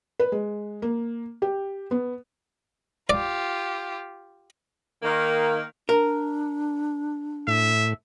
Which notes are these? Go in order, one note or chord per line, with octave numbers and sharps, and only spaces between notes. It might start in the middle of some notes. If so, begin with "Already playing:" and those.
B4
G#3
A#3
G4
B3
F4 G4 D5
D#3 A#3
D4 A#4
A2 E5